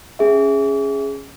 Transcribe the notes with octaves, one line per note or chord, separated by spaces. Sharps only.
C#4 G#4 E5